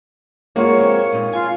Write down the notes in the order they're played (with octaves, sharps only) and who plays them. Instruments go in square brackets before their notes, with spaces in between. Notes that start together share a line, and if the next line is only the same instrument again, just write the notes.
[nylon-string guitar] F2 G#3 F#4 [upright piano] A#3 F4 [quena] C#5
[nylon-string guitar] G#3 C4
A#2 D#4
[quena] F4 [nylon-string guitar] G#5